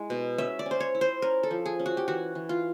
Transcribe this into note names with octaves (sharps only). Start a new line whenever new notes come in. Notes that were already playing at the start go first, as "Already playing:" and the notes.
Already playing: G#3 E4
B2
C#4 E5
D5
C#4
C5
C#5
E4
C5
C#4 A#4
A4
F3
G#4
C#4
F#4
G4
E3 F#4
E3
F4